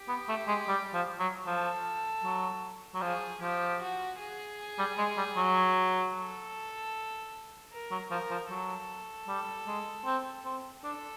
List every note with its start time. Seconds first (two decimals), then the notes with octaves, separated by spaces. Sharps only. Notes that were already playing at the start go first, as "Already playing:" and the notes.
Already playing: G4
0.08 B3
0.29 A3
0.47 G#3
0.68 G3
0.94 F3
1.19 F#3
1.46 F3 A4
2.24 F#3
2.94 F#3
3.02 F3 G#4
3.41 F3 G4
3.81 F#4
4.20 G#4
4.79 G3
4.98 G#3
5.17 G3
5.37 F#3
6.14 A4
7.72 A#4
7.91 F#3
8.11 F3 A#4
8.31 F3
8.49 F#3 A4
9.28 G3
9.67 G#3
10.05 C4
10.45 C4
10.84 D4 A4